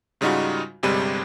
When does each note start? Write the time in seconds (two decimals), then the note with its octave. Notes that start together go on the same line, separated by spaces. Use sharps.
0.21 G#2 C#3 G3 D#4 F4 F#4
0.83 G1 C3 G3 G#3 B5 D#7